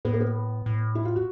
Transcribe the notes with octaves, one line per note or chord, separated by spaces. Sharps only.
A2 B3
A#3
B3
A2
E4
F4
F#4